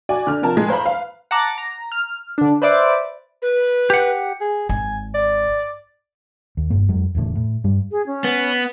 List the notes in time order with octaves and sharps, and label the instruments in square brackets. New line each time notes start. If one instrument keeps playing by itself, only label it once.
[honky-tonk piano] F#4 D5 G#5
D3 F6
C3 F3 A#4 A5
A2 G#3
B4 C5 F5 A#5 B5
B4 F5
[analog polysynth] F#5 A5 A#5 D6
A#5
F6
D3 D4
B4 C5 D5 E5 D6
[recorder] B4
[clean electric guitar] G4 F#5
[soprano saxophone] G#4
[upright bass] G#1 [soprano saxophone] G#5
[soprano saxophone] D5
[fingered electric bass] D#2
G1 G2 A#3
F2 F#3 G#3
E1 E2 A2 D3
A2
G2 G3
[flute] G#4
C#4
[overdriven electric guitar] B3